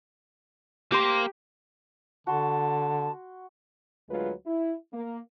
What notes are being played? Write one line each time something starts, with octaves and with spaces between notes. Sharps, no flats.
A#3 G4 C5 C6
D3 F#4 A5 C6
D2 F#3 G#3 F4 B4
E4
A#3